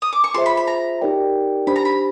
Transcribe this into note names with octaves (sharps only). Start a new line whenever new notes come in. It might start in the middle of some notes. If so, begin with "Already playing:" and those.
D#6
D6
C#6
F4 G#4 C5 E5 C6
B5
B5
A#5
D#4 G4 A#4 D5 G5
D4 G4 C5 B5
A#5
B5